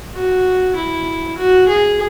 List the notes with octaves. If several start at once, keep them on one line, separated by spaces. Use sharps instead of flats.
F#4
E4
F#4
G#4